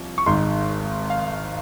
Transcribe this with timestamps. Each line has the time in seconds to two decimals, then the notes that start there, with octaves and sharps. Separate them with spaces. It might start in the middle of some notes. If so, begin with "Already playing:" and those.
Already playing: C2 F3
0.18 C#6
0.26 G#1 G#2 D#3 C6
1.10 F5